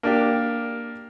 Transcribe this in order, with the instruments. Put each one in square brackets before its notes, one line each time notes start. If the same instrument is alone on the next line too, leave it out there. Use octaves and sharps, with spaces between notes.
[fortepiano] A#3 D4 G4